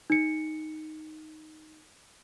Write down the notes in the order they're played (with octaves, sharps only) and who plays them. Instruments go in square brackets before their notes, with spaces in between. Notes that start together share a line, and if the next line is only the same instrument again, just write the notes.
[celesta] D#4 C#7